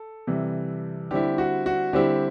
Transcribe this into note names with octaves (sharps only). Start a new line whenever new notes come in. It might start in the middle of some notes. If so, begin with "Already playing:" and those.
Already playing: A4
C3 E3 G3
D3 G3 C4 E4 G4
F#4
F#4
D3 G3 C4 E4 G4